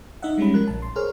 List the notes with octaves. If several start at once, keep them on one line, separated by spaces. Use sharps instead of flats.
D#4 D#5 E5 F#5
G3 G#3 C#4 B5
F3 A#4 F#6
A#1 A5
C6
G#4 A#4 C5 C#5 F6